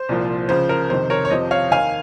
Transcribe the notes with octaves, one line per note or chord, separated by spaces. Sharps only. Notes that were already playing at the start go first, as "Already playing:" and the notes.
Already playing: C5
C2 A#2 F3
C#2 C#3 F3 C5
A#4
F2 C3 D#3 C5
A#4 C#5
C#5
F2 C3 F3 C5 D#5
C#5 F5
D#2 D#3 F5 G#5